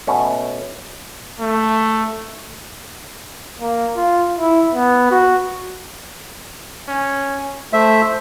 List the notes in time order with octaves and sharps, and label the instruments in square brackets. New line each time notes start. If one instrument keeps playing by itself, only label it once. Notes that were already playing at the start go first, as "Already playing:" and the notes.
[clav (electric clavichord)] B2 A3 C#4
[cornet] A3
[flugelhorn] A#3
F4
E4
B3
F#4
[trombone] C#4
[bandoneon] A3 E5 [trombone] C5